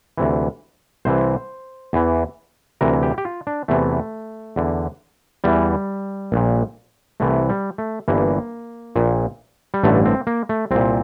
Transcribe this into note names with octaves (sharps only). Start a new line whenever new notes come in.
D2 C3 E3
C2 C3 E3 C5
E2 E3
D2 C3 E3 A#4
G4
G4
F4
D4
E2 C3 E3 A3
E2 D3
E2 E3 G3
A#1 A#2
C2 C3 E3 A3
G3
A3
G1 G2 E3 A#3
A#1 A#2
G3
A1 G2 D3 A3
C4
A#3
A3
C2 A#2 C4